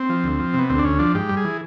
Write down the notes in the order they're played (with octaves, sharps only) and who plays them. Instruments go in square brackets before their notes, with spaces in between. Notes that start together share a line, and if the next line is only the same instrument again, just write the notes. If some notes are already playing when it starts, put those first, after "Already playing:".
Already playing: [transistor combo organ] C4
F3
D2
F3
C3
B3
D2 C4
D4
D2 C#4
F3 D4
G#2 G4
G3
G#4
E3